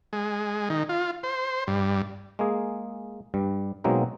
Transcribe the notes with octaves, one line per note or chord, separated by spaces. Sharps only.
G#3
D#3
F4
C5
G2
G#3 A#3 G#4
G2 G3
B2 F#3 G#3 A#3 C4 D#4